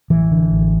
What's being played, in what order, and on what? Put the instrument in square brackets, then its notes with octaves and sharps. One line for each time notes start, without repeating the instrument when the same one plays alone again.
[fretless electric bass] A1 E3
D3
A1